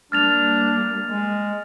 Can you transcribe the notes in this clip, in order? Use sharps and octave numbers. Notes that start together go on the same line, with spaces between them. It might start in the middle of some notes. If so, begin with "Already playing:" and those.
G3 A#3 D4 F6 A6 F7
G#3